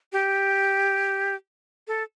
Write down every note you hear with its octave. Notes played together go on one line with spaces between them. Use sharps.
G4
A4